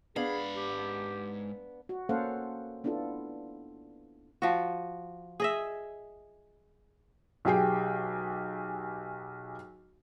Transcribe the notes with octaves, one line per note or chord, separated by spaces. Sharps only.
G#2 B3 D4 G#4 F5 B5
G4
F#4
A#3 C#4 A4 C5 F5 F#5
B3 D4 E4 F4 A4
F3 F#4
G#4 D#5 E5
B1 G4 G#4 G5 C7